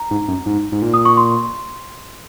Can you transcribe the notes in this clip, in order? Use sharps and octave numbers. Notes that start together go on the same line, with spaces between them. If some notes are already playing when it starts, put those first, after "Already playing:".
Already playing: A#5
G#2
F#2
G#2
G#2
A#2
D#6
C#6
C6